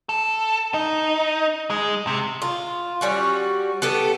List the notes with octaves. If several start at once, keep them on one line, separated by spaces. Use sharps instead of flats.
A4
D#4
G#3
C3
F4
G3 C#4 F#4
B3 G4 A4